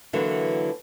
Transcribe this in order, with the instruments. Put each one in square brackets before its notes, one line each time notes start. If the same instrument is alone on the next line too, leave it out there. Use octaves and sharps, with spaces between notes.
[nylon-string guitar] D3 E3 F#3 A#3